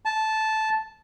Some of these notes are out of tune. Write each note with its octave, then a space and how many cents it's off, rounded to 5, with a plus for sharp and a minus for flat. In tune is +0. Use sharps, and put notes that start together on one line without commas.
A5 -10